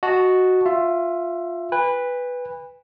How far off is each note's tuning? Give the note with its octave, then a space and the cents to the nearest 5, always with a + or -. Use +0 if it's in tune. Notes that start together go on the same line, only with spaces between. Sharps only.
F#4 +0 D#5 +0 A5 -10
F4 +10 E5 +20
B4 +0 G#5 -45 B5 +0